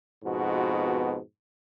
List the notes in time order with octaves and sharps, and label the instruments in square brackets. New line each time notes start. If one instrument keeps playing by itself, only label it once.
[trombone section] F2 G#2 B2 B3 F#4